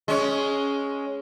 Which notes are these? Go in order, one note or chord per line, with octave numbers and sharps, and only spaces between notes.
G#3 C#4 C#5